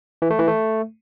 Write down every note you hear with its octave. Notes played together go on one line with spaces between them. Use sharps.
E3
A3
E3
A3